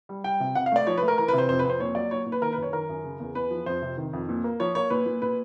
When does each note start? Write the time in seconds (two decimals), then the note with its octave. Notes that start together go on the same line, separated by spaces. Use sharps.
0.09 G3
0.24 G3 G5
0.40 C3
0.55 C3 F#5
0.66 F5
0.72 A3 D5
0.87 F3 C#5
0.97 B4
1.02 A3
1.08 A#4
1.18 E3 A#4
1.28 B4
1.33 C3
1.38 C5
1.49 F2 C5
1.59 B4
1.64 F2
1.70 C5
1.80 A#2 C#5
1.95 F#3 D5
2.11 A#2 C#5
2.26 A#2
2.32 B4
2.42 D#3 A#4
2.53 B4
2.58 F#2 C#5
2.73 D#3 A#4
2.89 F#2
3.04 C#3
3.20 E2
3.35 E2 B4
3.51 F3
3.66 F2 C5
3.82 C3
3.97 D#3
4.13 F2
4.29 A#2
4.44 A#3
4.60 F3 C#5
4.75 A#3 C#5
4.90 A#2 B4
5.06 A#2
5.22 A#2 B4